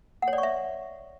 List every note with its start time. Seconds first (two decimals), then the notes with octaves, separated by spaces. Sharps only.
0.22 F#5
0.28 C#5
0.33 D5
0.38 C#6
0.43 E5